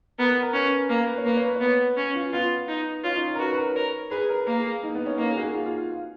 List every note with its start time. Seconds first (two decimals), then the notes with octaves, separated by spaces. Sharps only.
0.18 B3 A#4
0.30 B4
0.42 A#4
0.54 C#4 B4
0.90 A#3 A#4
1.07 B4
1.18 C#5
1.25 A#3 B4
1.36 C#5
1.46 B4
1.56 C#5
1.61 B3 B4
1.97 C#4
2.15 F4
2.33 B3 F4
2.69 D#4
3.04 C#4 F4
3.16 D#4
3.28 C#4
3.35 A#4
3.39 F#4 B4
3.53 B4
3.58 A#4
3.75 A#4 C#5
4.11 G#4 B4
4.29 A#4
4.47 A#3 A#4
4.59 G#4
4.83 D#4
4.95 B3
5.06 C#4
5.18 A#3 D#4
5.30 G#4
5.37 F#4
5.42 G#4
5.54 F4
5.66 F4
5.78 F4